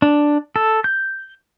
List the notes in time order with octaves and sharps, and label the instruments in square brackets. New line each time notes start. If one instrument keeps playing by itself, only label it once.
[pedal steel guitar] D4
A4
G6